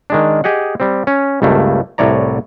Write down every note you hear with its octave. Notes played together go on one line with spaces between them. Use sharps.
D#3 G#3 D4
G4 G#4 D#5 F#5
G3 C4
C#4
C#2 G2 A3 A#3
C2 A2 C#5 D5 A#5